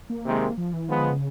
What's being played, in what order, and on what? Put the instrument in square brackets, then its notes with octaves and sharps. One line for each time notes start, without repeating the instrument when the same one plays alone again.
[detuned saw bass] A#3
[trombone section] C3 D#3 G#3
[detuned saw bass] F3
E3
[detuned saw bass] D#3 [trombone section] F3 G#3 B3
[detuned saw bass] D3
C#3